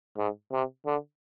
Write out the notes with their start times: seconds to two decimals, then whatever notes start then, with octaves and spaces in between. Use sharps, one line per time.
0.17 G#2
0.52 C3
0.86 D3